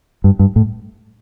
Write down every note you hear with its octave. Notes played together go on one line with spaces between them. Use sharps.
G2
G2
A2